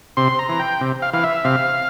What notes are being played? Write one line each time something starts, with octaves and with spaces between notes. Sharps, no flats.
C3 C6
A#5
E3
G5
C3
F5
E3 F5
E5
C3 F5